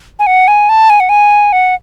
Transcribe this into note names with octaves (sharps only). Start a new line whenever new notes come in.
G#5
F#5
G#5
A5
G#5
F#5
G#5
F#5